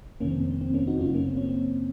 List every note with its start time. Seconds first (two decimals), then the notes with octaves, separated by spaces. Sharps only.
0.20 F2 C3 D#3 A#3 C#4
0.31 C4
0.40 A#3
0.51 C4
0.61 C4
0.74 A#3 C#4
0.87 D#4 F#4
1.00 F#2 C#3 C#4 F4
1.14 A#3 C#4
1.27 C4
1.37 C#4
1.48 C4